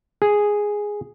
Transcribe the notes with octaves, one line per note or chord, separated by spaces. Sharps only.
G#4